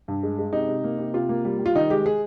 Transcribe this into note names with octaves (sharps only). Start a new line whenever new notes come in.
G2
G#3
G#3
C3 D#4
C3
A#3
C3
C3 F4
A#3
G3
G3
F4
D#3 D#4
G#3 G4
G#3 G#4